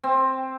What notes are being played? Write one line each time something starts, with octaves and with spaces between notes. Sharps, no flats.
C4